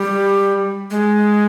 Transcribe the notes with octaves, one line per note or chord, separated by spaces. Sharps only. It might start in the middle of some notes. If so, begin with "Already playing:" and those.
Already playing: G3
G#3